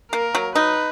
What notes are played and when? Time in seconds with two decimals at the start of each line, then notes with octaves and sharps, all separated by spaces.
0.12 A#3 A#4
0.35 F#3
0.55 D#4 B4